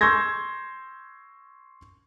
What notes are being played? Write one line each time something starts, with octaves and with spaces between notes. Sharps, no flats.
C6 C#6 E6 G6 G#6 A#6